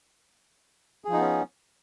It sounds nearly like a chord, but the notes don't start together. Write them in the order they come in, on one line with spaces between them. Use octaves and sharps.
G#4 F3 D#4 B3 C#4